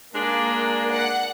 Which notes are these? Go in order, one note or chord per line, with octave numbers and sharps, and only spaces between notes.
G#3 A#3 D4
F#5